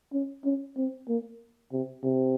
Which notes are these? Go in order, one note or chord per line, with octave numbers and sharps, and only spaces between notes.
C#4
C#4
C4
A#3
C3
C3